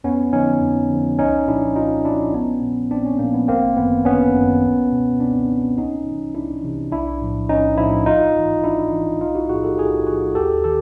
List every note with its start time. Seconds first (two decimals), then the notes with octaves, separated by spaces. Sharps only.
0.04 F2 B3 C#4
0.33 D3 F3 C#4 D#4
0.62 F2
0.90 D3 F3
1.19 C2 C#4 D#4
1.47 A#2 F3 D4 E4
1.76 C2 D#4 F4
2.05 A#2 F3 D4 E4
2.34 A#1 B3 C#4
2.62 A#2 F3
2.91 A#1 C4 D4
3.05 B3 C#4
3.19 A#2 F3 A#3
3.34 B3
3.48 G1 A#3 C4
3.77 F#2 D#3 B3
4.05 G1 B3 C#4
4.34 F#2 D#3
4.63 C#2
4.92 B2
5.20 C#2 C4 D4
5.48 B2
5.77 C2 C#4 D#4
6.06 C3 E3
6.35 C2 D4 E4
6.63 C3 E3
6.91 B1 D4 E4
7.21 A2 F3
7.49 B1 C#4 D#4
7.77 A2 F3 D4 E4
8.06 G#1 D#4 F4
8.36 G#2 E3
8.63 G#1 D4 E4
8.93 G#2 E3
9.21 B1 D#4 F4
9.35 E4 F#4
9.49 A2 F3 F#4 G#4
9.64 G4 A4
9.78 B1 F#4 G#4
10.07 A2 F3 F#4 G#4
10.35 D#2 G4 A4
10.64 D#3 G4 A4